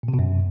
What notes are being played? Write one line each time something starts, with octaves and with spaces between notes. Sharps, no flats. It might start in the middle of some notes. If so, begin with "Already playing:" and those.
A#2
C3
B2
F#2